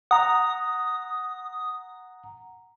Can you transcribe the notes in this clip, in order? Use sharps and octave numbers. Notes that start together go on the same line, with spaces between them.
F#5 A#5 D#6